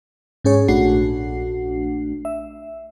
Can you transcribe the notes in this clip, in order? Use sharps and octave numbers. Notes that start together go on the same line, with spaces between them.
G#2 C#4 G#4 C#5
A#1 A3 D4 F#4 F#5 C7
E5